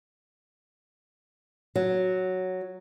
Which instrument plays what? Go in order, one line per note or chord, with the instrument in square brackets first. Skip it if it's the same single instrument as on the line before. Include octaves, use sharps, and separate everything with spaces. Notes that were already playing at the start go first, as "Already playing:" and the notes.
[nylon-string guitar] F#3